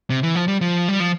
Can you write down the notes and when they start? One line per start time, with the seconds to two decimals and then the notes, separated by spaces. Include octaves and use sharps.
0.10 C3
0.23 E3
0.35 F3
0.48 G3
0.61 F3
0.88 G3
1.00 F3